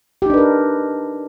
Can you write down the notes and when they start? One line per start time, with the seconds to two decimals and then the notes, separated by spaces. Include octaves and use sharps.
0.22 G4
0.26 D#4
0.30 D4
0.34 B4
0.37 A#4